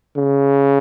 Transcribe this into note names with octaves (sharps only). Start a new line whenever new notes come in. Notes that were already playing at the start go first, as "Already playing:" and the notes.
C#3